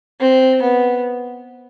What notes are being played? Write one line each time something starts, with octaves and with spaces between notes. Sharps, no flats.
C4
B3